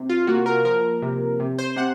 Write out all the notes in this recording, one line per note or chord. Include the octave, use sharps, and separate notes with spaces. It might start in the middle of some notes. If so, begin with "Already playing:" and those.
Already playing: C3
F4
A#3 F#4
A#4
F3 A#4
C3
C3
C5
C3 F#5